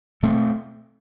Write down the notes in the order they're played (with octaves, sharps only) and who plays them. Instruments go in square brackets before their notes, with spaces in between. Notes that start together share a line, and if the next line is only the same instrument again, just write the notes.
[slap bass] B2 A3 C4